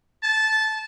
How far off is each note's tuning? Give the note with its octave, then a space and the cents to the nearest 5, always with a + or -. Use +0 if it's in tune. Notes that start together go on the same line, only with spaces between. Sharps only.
A5 -15